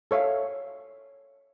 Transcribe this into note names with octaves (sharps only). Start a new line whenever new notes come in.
A4 C#5 E5 F5